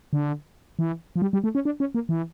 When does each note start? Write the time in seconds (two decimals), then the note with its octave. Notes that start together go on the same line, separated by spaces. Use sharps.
0.13 D3
0.79 E3
1.16 F3
1.22 G3
1.33 G3
1.44 A3
1.55 C#4
1.65 D4
1.80 C#4
1.95 A#3
2.09 E3